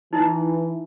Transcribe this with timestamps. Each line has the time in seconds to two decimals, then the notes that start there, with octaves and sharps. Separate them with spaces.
0.13 E3 D#4 E4